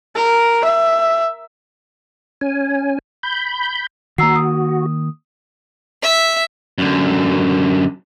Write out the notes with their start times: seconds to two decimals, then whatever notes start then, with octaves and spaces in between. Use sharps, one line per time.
0.16 A#4
0.64 E5
2.41 C#4 G#5
3.23 B5 G6
4.18 D#3 A#3 F#4 A#5 E6 C7
4.36 D#6
6.03 E5
6.78 F#2 D3